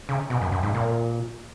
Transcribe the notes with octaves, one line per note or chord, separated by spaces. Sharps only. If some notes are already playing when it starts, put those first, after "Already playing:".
C#3
B2
F#2
F#2
G#2
A#2